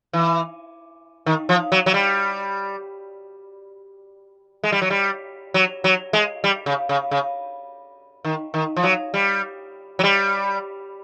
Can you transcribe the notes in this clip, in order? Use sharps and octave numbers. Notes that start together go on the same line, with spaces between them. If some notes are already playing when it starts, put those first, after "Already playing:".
E3
D#3
F3
F#3
F#3
G3
G#3
G3
F#3
G3
F#3
F#3
G#3
G3
C#3
C#3
C#3
D#3
D#3
F3
F#3
G3
F#3
G3